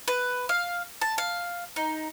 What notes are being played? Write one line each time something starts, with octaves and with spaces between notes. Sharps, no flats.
B4
F5
A5
F5
D#4